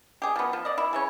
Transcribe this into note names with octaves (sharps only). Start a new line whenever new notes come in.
G4 G#4
F3 B3
F3
D5 D#5
E4
C#3 E3 C#5